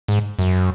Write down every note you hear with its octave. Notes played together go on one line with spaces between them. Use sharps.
G#2
F#2